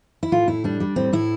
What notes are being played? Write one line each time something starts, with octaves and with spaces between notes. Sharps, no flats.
E4
A2 F4
A2 E4
G3 D4
G3
A2 C4
A2 E4